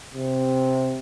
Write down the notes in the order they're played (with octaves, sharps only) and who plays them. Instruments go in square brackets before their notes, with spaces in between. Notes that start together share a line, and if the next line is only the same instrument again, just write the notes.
[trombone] C3